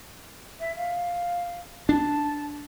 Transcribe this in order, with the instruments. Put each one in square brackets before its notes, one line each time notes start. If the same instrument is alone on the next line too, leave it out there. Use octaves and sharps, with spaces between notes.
[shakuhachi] E5
F5
[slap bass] D4 [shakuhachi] A5